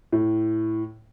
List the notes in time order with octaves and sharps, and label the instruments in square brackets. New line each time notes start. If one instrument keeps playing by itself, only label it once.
[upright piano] A2